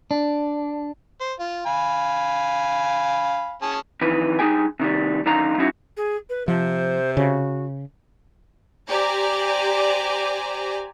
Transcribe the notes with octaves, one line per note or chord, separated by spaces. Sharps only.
D4
C5
F4
F5 G#5 B5
C#4 G#4 A5
F2 D#3 E3 B4
G2 D#4 G#4 G5 G#5
C3 D#3 G3
F#2 D3 D#3 D#4 F4 A#5
F#3 C#4 D#4 E4 F#4
G#4
B4
C3 F3 C5
C#3 F#4
G4 C5 D5 G#5 A#5